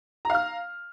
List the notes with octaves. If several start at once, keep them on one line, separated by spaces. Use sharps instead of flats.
F5 A#5 F6